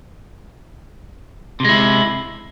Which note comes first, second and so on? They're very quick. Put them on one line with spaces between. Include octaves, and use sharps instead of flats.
C3 G#3 E4